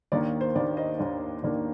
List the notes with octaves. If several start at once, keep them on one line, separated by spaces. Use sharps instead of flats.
D#2 D#3 A#3 D4 D5
C5
D#2 D#3 A#3 D4 D5
C5 D#5
D#2 D#3 A#3 D4
D#2 D#3 A#3 D4 D5